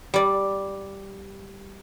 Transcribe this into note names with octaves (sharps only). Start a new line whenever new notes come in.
G3 D5